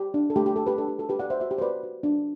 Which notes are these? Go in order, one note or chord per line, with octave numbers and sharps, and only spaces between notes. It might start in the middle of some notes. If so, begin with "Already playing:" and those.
Already playing: G4
D4
A4
A3 G4
G4
A3 A4
G4 B4
D4 A4
G4
F#4 A4
G4 B4
F#4 D5 F#5
C5 E5
F#4 C5 E5
G4
C5
F#4 B4 D5
F#4
D4